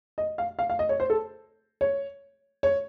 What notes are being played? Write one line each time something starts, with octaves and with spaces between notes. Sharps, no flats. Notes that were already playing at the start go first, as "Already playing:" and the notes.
D#5
F5
F5
F5
D#5
C#5
C5
A4
C#5
C#5